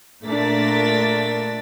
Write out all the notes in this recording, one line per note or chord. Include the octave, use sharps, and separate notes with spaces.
A#2 A3 D4 A#4 A6 B6